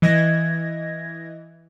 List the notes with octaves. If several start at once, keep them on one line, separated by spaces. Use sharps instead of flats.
E3 D#5 G#6 A#6